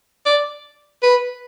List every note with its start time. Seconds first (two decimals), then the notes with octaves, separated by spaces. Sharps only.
0.25 D5
1.03 B4